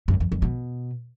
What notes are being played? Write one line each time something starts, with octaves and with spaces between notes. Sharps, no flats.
F#2
F2
F2
B2